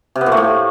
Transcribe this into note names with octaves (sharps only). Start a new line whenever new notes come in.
C3
B3
A#2
A3
A2